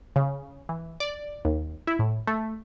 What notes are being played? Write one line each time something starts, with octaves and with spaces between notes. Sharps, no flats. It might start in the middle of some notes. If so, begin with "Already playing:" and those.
C#3
E3
D5
D#2
E4
A2
A3